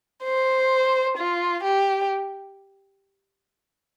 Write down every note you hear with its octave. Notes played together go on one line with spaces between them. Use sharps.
C5
F4
G4